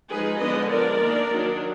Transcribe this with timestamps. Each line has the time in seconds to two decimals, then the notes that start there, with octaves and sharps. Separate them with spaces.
0.11 F3 G#3 D#4 G#4 B4
0.41 D3 F3 G#3 B3 D4 B4 D#5
0.72 F3 G#3 D4 A#4 D5
1.01 D#3 A#3 D4
1.32 D#3 F#3 D4